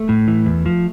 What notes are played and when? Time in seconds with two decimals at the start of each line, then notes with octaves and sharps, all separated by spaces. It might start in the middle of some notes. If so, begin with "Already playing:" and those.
Already playing: A3
0.09 A2
0.28 E3
0.46 E2
0.66 F3